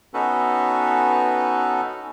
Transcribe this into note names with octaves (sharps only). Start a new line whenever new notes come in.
B3 C#4 D#4 F#4 A4 B4